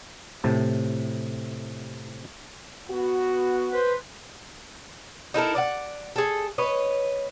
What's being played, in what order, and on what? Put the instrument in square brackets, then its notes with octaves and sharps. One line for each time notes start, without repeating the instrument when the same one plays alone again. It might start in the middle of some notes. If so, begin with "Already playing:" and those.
[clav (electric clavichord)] A2 C3 A5
[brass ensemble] B3 F#4
[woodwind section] B4 C5
[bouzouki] D#4 E4 A4 A#4
D5 E5 F#5
G#4 A4
B4 C#5 D#5